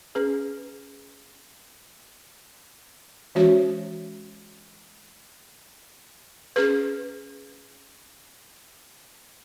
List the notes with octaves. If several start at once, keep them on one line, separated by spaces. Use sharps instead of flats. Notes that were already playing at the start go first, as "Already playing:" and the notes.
C#4 G#4 B4
E3 G#3 C#4 F#4 C#5
C#4 G#4 B4